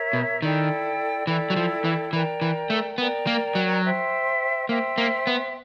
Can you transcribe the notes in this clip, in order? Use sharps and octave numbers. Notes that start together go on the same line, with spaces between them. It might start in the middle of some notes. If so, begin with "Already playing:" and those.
Already playing: A#4 C#5 E5
B2
D#3 E4 A4 D5 G5
E3 E4 A4 D5 G5
F#3
F3
E3
E3 A#4 D5 G5
E3
A3
B3 A#4 D5 G5
A#3
F#3
C5 E5 G5 C6
A#3 C5 E5 G5 C6
A#3
B3